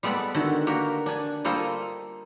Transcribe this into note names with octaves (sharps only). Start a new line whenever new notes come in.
G3 G#3 B3 A4 D5 B5
D3 D#3 F#4 E5
A#3 F#4 G4 A#4
D4 G#5
G3 A#3 F4 A4 C5 D#5